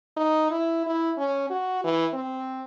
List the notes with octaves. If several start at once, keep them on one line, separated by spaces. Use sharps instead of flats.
D#4
E4
E4
C#4
F#4
E3
C4